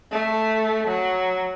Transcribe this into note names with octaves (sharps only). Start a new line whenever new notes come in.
A3
F#3